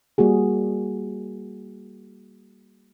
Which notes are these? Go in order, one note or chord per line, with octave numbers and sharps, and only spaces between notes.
G3 A#3 F#4 G#4